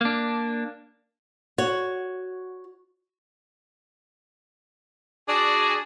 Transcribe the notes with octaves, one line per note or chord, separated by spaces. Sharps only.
A#3 D4
F#4 C#5
D4 F#4 G#4 D5